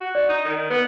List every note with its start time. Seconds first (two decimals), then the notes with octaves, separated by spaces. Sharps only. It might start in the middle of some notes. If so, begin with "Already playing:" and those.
0.01 F#4
0.15 D5
0.29 D#4
0.45 D#3
0.70 B3 B4